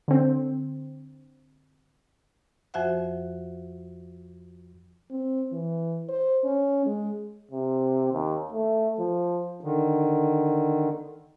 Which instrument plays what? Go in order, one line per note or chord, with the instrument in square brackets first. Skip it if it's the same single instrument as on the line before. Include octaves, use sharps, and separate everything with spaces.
[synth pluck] D3 C4
[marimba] F2 F3 F#4 C5 E5 F#5
[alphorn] C4
E3
C5
C#4
G#3
[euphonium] C3
D#2
A3
F3
[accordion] D3 D#3